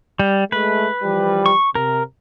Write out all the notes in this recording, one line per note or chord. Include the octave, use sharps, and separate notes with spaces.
G3
G#3 A3 B4
E3 F3 G3
C#6
C3 A#4